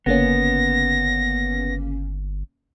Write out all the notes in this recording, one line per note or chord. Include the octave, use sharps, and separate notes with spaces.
G1 C#3 A#3 B3 C#4 A#6